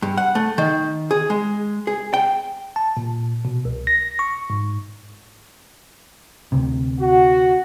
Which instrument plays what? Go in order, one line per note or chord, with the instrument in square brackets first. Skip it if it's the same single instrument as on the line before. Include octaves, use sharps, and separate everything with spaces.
[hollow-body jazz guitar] G2
F#5
A3
D#3
G#4
G#3
G#4
G5
[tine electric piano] A5
A#2
B2
C2
A#6
C#6
G#2
[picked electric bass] D2 C3
[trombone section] F#4